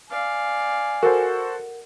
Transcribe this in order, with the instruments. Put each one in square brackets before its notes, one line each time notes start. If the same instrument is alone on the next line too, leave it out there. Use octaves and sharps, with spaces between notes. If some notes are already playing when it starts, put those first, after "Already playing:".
[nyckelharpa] D5 F5 [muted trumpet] G#5
[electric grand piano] F#4 A4 C5 [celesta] A#4 F#5